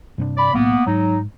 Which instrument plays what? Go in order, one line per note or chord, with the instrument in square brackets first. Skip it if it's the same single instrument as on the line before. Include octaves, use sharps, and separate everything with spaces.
[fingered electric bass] G2 C3 D4
[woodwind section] D5 B5
[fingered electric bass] B1 A2 [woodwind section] A#3 B3
[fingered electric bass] G#2 [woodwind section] F#3 D#4